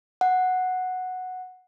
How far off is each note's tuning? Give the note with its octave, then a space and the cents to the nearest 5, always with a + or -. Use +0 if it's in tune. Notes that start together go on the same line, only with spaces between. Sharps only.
F#5 -5